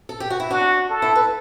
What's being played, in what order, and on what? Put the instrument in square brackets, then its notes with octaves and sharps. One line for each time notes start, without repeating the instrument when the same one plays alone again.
[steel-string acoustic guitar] A4
G4
F#4
E4
[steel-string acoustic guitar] D4 [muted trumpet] F#4
[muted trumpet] A4
[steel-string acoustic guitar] E4
B4